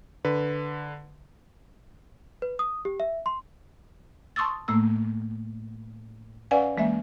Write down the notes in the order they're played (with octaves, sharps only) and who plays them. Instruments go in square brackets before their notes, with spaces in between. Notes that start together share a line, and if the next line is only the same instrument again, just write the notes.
[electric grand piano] D3 B4
[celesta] B4
D#6
G4
E5
C6
[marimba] A5 C6 C#6 D#6 E6 A6
A2 A3 A#3 E6
C#4 B4 D5 F5 F#5 G#5
E3 G#3 A#3 E5